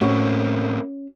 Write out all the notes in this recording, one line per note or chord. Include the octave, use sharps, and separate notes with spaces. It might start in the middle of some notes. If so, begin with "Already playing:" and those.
A2 A3 A#3 C4 C#4 F#4